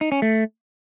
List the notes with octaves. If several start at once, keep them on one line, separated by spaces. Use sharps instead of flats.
D#4
C#4
A3